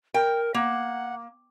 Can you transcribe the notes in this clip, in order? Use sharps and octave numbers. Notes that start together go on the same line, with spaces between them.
A#4 G5
A#3 F#5